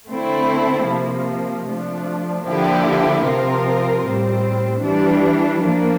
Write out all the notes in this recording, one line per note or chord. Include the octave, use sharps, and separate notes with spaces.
D3 A3 C4 E4
C3 F3 A#3
F3 A3 D4
D3 F3 A#3 E4 G4
C3 F3 C4 F4 A#4
A2 G3 C4
E3 G3 D4
F3 A#3 D4